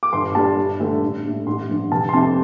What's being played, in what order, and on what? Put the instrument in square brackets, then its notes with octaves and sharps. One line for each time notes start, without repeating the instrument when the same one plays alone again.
[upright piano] D6
G1 C6
G2 G3 D4 A5
G1
G2 D3 A3 D4
A1
A2 G3 D4
A1 C6
G2 F3 D4
F1 A5
C6
F2 C3 A5